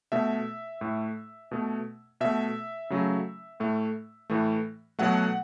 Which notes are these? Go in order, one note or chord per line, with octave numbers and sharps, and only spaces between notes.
B2 A3 E5
A2 A3
B2 A3
B2 A3 E5
C#3 F#3 A3
A2 A3
A2 E3 A3
B2 F#3 A3 F#5